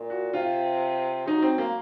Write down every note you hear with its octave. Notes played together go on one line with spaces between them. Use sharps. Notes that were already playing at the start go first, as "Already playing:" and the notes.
Already playing: A#2
F#4
C3 F4
F#3 D#4
C4
A#3